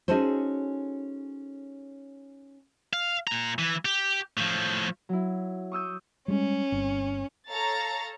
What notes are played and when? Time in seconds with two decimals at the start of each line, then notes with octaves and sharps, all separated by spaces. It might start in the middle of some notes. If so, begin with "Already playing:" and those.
0.08 C#4 D#4 F#4 G#4 A4 C5
2.93 F5
3.27 A#2 A#5
3.59 E3
3.85 G4
4.37 A2 F3
5.09 F#3 E4
5.72 C#6 D#6 E6 G6
6.28 G3 G#3 C#4
6.72 G1 C4
7.48 A4 C#5 F5 A#5 A6